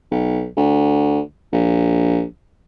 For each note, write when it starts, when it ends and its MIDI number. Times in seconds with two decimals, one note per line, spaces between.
0.11 0.47 35
0.57 1.20 38
1.53 2.24 34